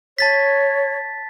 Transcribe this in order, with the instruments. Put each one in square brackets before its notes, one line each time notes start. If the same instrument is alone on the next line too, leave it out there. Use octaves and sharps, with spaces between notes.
[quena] C#5 [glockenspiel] A5 A6 B6